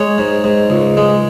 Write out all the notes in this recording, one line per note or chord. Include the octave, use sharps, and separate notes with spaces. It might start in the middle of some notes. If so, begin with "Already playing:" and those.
Already playing: G#3 C#5
G#2
G#2
C#2
G#3